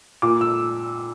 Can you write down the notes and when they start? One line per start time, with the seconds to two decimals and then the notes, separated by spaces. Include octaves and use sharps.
0.22 A#2 D6
0.41 E6